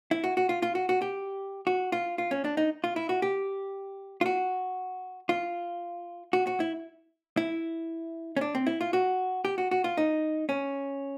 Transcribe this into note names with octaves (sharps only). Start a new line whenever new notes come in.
E4
F#4
F#4
F4
F4
F#4
F#4
G4
F#4
F4
F4
C#4
D4
D#4
F4
E4
F#4
G4
F4
F#4
F4
F#4
F#4
E4
E4
C#4
D4
C4
E4
F4
F#4
G4
F#4
F#4
F4
D#4
C#4